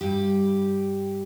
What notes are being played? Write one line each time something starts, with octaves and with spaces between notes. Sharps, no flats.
G2 G3 G4